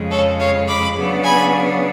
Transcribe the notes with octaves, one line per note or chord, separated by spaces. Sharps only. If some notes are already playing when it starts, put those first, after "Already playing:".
Already playing: F2 C#3 G#3
A4 C#5
C#5 F5
B5 D6
C#3 F#3 B3 D4
G#5 B5